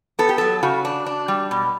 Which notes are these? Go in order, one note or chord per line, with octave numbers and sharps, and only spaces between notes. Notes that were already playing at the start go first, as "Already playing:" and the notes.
B3 A4
G4
F#3 A4
C#3 F#4
D4
D4
G3
B2